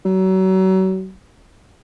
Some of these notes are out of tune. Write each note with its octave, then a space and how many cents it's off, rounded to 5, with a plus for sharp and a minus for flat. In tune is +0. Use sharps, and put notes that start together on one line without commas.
F#3 +35